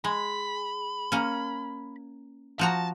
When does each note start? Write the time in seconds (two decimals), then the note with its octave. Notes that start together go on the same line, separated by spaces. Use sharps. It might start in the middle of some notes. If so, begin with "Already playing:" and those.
0.04 G#3 B5
1.12 A#3 C#4
2.59 F3 F#4 A5 A#5